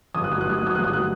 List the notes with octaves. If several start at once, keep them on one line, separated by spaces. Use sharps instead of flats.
G1 D#6
F#6
F#3 D#6
F#6
F#3 D#6
F#6
F#3 D#6
G1 F#6
D#6
F#3 F#6